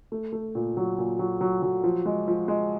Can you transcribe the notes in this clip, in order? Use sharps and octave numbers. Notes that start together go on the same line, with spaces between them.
A3
A3
A#2
F#3
A#2
F#3
F#3
F#3
F3
G#3
F3
G#3